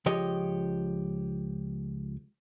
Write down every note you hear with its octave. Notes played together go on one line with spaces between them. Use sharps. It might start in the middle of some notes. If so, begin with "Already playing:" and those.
C#2 F3 G4 C#5 D#5